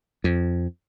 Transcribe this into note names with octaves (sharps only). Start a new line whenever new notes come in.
F2